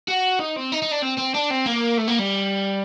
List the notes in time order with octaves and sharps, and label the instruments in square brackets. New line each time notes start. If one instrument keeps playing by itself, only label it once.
[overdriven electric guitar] F#4
D#4
C4
D#4
D#4
D4
C4
C4
D4
C4
A#3
A3
A#3
G3